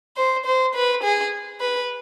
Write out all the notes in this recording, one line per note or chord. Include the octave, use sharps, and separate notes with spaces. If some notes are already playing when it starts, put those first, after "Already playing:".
C5
C5
B4
G#4
B4